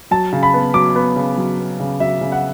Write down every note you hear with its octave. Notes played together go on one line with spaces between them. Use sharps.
F#3 A5
C#3
B5
B3
F#3 D6
B3
C#3
F#3
B3
C#3
F#3 E5
C#3
F#5